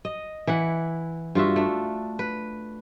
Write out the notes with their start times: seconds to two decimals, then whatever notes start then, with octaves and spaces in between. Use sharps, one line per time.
0.05 D#5
0.47 E3 E4 F#5
1.35 G2 F4 F#4 E5
1.56 A3 D4
2.19 B4